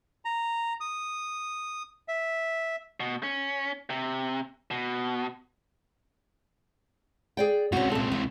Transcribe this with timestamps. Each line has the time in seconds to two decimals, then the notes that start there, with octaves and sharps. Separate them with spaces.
0.25 A#5
0.80 D#6
2.08 E5
3.00 B2
3.23 C#4
3.90 C3
4.71 B2
7.37 G#4 D5 G5
7.72 C#2 C3 C#4 F#4
7.92 A#2 A4
8.12 E3